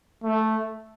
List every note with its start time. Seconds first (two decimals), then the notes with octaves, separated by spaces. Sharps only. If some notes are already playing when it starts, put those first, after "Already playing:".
0.24 A3